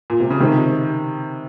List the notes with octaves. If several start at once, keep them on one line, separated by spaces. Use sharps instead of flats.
A#2
C3
C#3
C3 D#3